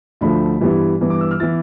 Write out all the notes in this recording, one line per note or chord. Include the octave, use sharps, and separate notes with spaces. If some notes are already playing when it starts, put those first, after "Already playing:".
D2 D3 F3 A3 B5
G2 E3 G3 B3 E4
G2 E3 B3
D6
E6
F6
E3 B3 E4 A6